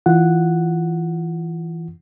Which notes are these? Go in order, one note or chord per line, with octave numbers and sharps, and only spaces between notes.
E3 F4 F#5